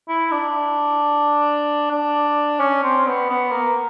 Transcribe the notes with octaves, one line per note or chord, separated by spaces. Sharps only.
E4
D4
D4
C#4
C4
B3
B3
A#3